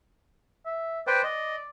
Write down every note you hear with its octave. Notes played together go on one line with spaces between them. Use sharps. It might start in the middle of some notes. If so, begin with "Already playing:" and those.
E5
B4 C5 D5 G5
D#5